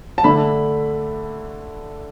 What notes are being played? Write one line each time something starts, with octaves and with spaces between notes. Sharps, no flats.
A5
D3 A3 D4 B5